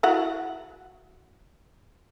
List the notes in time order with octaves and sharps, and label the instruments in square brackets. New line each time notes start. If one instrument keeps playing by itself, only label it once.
[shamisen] E4 F#4 F#5